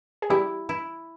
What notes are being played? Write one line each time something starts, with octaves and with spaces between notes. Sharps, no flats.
G#4
G3 E4 G4
E4